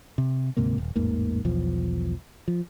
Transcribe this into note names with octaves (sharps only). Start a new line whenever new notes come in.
C3
D2 G#2 C3 A#3
D#1
A1 E2 G#2 A#3
E1 B1 E2 F3
F3